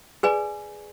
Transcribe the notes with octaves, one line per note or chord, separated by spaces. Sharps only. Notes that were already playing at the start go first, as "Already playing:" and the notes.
G#4 B4 D5 G#5